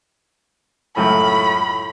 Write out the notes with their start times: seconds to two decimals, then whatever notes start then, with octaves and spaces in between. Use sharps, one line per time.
0.97 C#2 F#2 A2 A3 B5